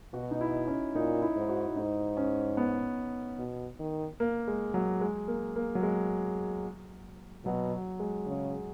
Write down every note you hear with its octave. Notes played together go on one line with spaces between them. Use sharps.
B2 F#4
D#4
E4
C#4
A#2 D#4
E4
G#2
F#4
G#2 D#4
C#4
B3
B2
D#3
A#3
G#3
F#3
G#3
A#3
A#3
F#3
G#3
B2 F#3
G#3
C#3